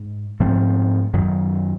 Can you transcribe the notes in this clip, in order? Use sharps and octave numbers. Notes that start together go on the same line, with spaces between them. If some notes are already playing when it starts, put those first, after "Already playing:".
Already playing: G#2
G#2 F3 A3 C4
F#2 D#3 F#3